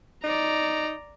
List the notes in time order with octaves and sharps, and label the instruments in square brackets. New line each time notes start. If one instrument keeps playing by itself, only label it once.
[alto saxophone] D#4 [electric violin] D5 A#5